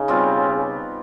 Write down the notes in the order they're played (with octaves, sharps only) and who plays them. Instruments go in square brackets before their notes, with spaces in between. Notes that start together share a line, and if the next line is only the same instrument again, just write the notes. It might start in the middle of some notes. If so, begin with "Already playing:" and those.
Already playing: [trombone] C#3 [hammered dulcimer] D#4
[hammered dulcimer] B2 G3 C4 F4